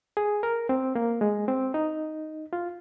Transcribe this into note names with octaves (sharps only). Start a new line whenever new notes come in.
G#4
A#4
C4
A#3
G#3
C4
D#4
F4